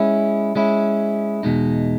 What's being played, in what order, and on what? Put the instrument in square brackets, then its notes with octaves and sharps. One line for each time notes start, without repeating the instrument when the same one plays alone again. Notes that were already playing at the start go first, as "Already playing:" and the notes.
Already playing: [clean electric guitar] G#3 C#4 E4
G#3 C#4 E4
E2 B2 G#3 D#4